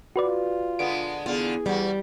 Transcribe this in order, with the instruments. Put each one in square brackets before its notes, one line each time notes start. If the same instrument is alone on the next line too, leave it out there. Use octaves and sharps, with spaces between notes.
[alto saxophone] F4 [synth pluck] F#4 B4 D5
[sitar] D3 G#3 B3 [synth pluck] D7
[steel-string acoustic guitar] E2 [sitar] D3 F4 [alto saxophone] G#4
[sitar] E2 F#4 [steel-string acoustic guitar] G3